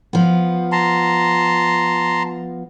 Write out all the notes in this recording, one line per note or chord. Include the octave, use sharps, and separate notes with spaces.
F3 B3
A5 A#5 C6